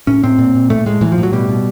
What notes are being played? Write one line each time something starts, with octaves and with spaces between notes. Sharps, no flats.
A2 C#4
A2 C4
A#2
A#2
A2 A3
A2 G#3
A2 E3
F3
A2
F#3
B2 G3
B2